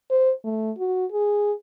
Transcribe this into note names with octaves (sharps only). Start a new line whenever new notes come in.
C5
A3
F#4
G#4